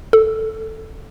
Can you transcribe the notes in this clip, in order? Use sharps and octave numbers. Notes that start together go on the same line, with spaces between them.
A4